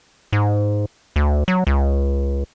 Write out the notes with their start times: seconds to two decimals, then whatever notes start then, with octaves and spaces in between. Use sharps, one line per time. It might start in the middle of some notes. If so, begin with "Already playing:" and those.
0.33 G#2
1.16 D2
1.48 F#3
1.67 C#2